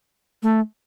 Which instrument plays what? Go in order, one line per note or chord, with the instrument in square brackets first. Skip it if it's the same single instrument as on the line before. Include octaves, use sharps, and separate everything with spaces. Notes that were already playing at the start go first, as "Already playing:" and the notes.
[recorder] A3